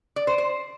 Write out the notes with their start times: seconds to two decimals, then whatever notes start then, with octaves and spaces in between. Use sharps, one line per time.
0.16 D5
0.27 C5
0.38 C5